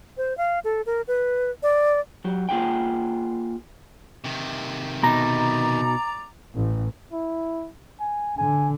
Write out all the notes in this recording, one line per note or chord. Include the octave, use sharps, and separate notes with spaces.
C5
F5
A4
A#4
B4
D5
F#3 F#4 G4
A#3 F4 G#4 F#5 G5
C3 D#3
B2 D#4 D5 A#5
A1
E4
G#5
D3 G#5